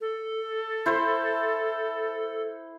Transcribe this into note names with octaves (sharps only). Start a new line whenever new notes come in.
A4
E4 C5